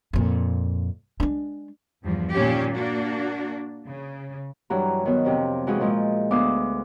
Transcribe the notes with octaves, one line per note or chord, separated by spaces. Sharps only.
F2 A#2
G#3 D4
E2 G2 F3
A#2 D#3 C#4 G4
A#3 D4 F#4
C#3
G2 E3 F#3 A#5
D#3 F#3 B3
F2 C3 F3
E3 F3 G#3 F4 F#4 G#4
A#2 F3 G#3
D2 B3 F5 D6 D#6